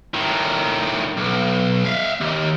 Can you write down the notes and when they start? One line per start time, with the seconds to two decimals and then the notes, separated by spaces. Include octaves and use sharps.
0.14 A2 D#3
1.17 B1
1.85 E5 F5
2.21 D#2